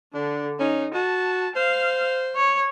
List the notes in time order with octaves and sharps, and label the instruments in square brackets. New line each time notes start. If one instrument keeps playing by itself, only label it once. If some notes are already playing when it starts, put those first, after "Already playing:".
[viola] D3 [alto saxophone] D4
[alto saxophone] C#4 [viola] D#4
[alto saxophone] F#4 [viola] A5
[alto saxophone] C5 [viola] F5
[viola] C#5